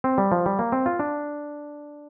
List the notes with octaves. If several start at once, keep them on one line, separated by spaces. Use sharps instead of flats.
C4
G3
F3
G3
A#3
C4
F4
D4